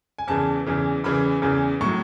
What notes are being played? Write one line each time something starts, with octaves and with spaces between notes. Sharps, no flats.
G#5
E2 C#3 E3 A5
E2 C#3 E3
E2 C#3 E3 B5
E2 C#3 E3
A2 F#3 C#6